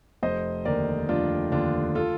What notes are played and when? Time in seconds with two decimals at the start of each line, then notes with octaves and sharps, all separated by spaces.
0.23 F1 C5 D#5
0.65 D#2 D3 A#4 D5
1.09 F1 D4 F4
1.52 D#2 D3 D4 F4
1.95 F4 A4